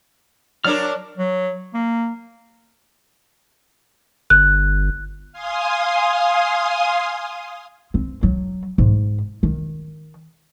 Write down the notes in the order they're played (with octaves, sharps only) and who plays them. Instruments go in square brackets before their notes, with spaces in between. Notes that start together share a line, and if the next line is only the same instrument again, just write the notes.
[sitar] F#3 D4 A#4 [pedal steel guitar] C#5 D5 F6
[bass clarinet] F#3
A#3
[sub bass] G1 [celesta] F#6
[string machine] F5 G#5 C6 D#6
[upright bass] C4
F#3
G#2
D#3